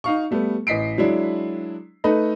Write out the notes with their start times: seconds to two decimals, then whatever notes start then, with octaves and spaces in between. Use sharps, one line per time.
0.04 D#4 F5 C#6
0.31 G3 A3 B3
0.67 A1 D#5 B6 C7 D7
0.98 F#3 G#3 D4 E4
2.04 A3 D#4 A4 B4 D#5